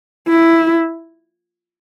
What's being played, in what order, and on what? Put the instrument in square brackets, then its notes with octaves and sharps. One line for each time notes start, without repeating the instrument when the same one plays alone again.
[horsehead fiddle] E4